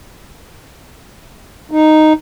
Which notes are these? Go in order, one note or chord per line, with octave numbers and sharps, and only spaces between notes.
D#4